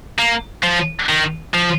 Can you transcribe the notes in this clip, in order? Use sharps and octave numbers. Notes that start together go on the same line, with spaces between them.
A#3
F3
D#3
F3